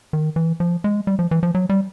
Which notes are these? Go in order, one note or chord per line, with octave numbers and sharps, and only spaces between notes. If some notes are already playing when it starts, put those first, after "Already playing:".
D#3
E3
F3
G#3
G3
F3
E3
F3
F#3
G3